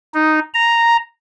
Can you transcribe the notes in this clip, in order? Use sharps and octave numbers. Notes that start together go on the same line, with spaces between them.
D#4
A#5